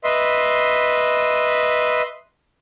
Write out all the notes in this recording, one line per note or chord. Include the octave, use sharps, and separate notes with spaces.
B4 D#5 E5 C6